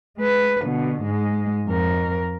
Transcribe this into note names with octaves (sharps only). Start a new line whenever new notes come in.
G#3 B4
B2 D3
G#2 G#3
F2 A#4